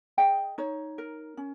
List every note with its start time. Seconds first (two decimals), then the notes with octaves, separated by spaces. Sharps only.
0.18 G#4 D#5 G5
0.58 D#4 C#5
0.98 A#4
1.37 C#4